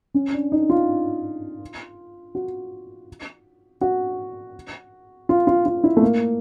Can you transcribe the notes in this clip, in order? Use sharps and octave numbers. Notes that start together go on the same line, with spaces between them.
C#4
D4
D#4
F4
F#4
F#4
F4
F4
F4
E4
A3
A#3